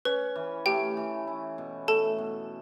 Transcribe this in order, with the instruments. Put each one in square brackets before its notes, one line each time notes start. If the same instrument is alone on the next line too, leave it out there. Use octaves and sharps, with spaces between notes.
[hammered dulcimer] C#4 [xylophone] B4
[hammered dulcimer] E3
[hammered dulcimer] A3 [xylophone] G4 G5
[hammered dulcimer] E3
E4
B2
[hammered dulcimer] A3 [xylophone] A4 A5
[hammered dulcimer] B2